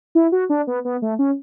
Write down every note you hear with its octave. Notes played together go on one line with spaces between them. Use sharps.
E4
F#4
D4
B3
B3
A3
C#4